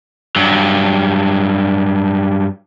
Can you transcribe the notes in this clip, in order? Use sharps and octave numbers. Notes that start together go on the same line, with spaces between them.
G2 F#3